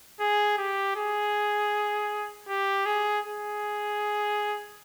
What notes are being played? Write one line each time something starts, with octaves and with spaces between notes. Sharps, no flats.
G#4
G4
G#4
G4
G#4
G#4